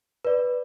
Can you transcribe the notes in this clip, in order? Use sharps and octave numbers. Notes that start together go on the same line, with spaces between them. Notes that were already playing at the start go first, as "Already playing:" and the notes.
B4 D5